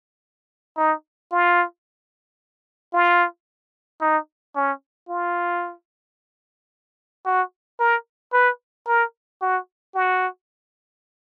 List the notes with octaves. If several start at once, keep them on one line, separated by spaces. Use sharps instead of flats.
D#4
F4
F4
D#4
C#4
F4
F#4
A#4
B4
A#4
F#4
F#4